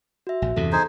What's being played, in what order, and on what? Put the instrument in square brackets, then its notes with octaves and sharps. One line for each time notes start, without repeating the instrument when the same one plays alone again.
[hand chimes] F#4 E5
[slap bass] A#1
[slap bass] E2 G2 C3 [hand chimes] A4
[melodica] D#4 G#4 C5